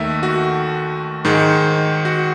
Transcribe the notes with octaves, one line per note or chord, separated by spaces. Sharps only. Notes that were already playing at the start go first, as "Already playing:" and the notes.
Already playing: D#2 D#3 A3 E5
F#4
G#2 D#3 G#3
F#4